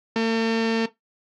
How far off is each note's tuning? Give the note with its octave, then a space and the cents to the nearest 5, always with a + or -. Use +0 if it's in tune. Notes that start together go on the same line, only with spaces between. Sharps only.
A3 +45